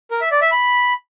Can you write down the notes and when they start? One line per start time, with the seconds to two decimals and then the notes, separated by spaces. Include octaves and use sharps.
0.11 A#4
0.21 E5
0.31 D5
0.41 E5
0.52 B5